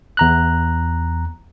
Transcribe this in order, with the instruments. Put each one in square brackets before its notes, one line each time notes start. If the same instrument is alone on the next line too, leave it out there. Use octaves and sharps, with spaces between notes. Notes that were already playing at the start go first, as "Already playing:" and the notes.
[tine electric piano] E2 A#5 F#6